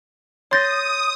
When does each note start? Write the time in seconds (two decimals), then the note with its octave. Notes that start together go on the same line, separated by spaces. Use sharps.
0.51 C#5 C6 D#6 G6 A6 A#6